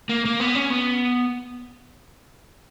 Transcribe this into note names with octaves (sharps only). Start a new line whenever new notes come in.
A#3
A#3
B3
C#4
B3